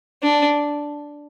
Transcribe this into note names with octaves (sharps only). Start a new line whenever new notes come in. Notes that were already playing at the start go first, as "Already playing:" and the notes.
D4